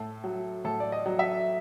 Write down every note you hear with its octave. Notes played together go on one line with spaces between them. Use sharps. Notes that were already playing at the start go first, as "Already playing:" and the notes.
Already playing: A2 A4
F#3
A2 A4
D5
D#5
F#3
E5